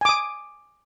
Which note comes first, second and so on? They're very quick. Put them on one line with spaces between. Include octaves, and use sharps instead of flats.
G#5 D6 D#6